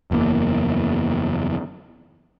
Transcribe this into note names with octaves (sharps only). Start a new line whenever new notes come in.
F#1 E2 G2 A#3